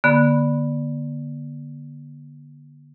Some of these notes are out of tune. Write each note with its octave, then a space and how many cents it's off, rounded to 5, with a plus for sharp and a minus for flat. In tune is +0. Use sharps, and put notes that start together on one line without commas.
D3 +0 A#3 +45 B5 +0